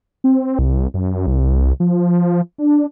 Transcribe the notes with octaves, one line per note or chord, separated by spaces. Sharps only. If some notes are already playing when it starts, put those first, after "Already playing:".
C4
C2
F#2
C2
F3
D4